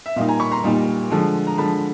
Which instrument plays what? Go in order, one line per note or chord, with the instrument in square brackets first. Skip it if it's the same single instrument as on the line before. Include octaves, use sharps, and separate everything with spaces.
[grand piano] E5
A#2 G3 A#3 D#4 D#5 F5
G#5 A#5
B5 C#6
A#5 C6
A#2 G3 A#3 D#4
D3 F3 G#3
A#5
D3 F3 G#3 A5 B5